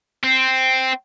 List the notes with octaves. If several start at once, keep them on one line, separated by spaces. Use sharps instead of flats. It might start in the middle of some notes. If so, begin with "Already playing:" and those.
C4